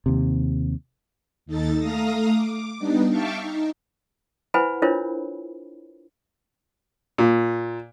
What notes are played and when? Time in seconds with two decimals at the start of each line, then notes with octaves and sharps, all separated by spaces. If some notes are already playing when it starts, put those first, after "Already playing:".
0.06 D#2 C3
1.46 D#2 D#4 A4 A6
1.79 A3 F5 A#5 D#6 A#6
2.31 D6
2.79 G3 B3 D4 D#4
3.09 E5 F5 G5 A5 C#6 D6
3.40 D#4
4.54 E4 B4 C5 F#5 G#5 B5
4.82 D4 E4 F4 A#4 C5 C#5
7.18 A#2